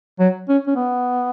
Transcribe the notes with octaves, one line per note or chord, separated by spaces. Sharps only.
F#3
C#4
C#4
B3